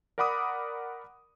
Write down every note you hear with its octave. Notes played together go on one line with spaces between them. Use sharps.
A#4 D5 F#5 B5 D6 D#6